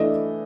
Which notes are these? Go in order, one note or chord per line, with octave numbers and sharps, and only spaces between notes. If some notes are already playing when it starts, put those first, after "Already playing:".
Already playing: E3 A3 D4 D#5